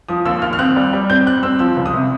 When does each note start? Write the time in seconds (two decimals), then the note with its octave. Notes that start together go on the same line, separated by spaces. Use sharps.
0.09 F3 D#6
0.25 D#2 E6
0.42 D#2 F6
0.53 F6
0.59 C4 F#6
0.76 G3
0.93 G3
1.09 C4 G6
1.26 G3 F#6
1.43 C4 E6
1.59 F3 E6
1.77 C#2
1.86 D#6
1.94 C3